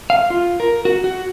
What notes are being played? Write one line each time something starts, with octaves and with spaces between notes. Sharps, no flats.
F5
F4
A#4
F#4
F#4